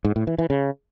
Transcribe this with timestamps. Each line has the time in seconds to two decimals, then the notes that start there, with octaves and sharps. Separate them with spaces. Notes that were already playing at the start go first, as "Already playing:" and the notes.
0.05 G#2
0.16 A2
0.27 E3
0.38 E3
0.50 C#3